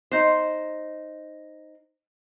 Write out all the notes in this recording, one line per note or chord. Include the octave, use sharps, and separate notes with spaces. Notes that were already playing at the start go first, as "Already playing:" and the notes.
D#4 C5